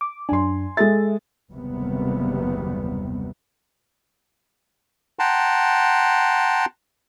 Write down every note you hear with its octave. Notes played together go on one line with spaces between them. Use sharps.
D6
F#2 D4 G#5 C6
G#3 A4 E5 A6
F#1 D#2 C3 G3 B3
F#5 G5 A5 A#5 C6